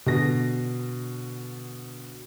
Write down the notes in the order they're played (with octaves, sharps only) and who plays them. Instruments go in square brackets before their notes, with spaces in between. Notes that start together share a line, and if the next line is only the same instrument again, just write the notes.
[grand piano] B2 D3 A#6